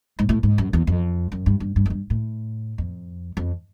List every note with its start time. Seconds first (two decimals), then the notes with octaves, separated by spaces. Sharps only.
0.19 G#2
0.29 A2
0.43 G#2
0.58 F#2
0.73 E2
0.87 F2
1.32 F#2
1.46 G2
1.60 G2
1.76 G2
1.86 F#2
1.90 G2
2.10 A2
2.78 F2
3.37 F2